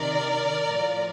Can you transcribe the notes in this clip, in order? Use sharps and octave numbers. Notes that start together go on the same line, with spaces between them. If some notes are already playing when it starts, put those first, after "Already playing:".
Already playing: C3 D#3 A#4 D5
A2 F3